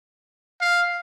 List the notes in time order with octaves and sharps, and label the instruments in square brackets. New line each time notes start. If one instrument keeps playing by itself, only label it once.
[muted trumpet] F5